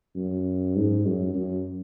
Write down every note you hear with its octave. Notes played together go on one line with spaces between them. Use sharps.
F#2
G#2
F#2
F#2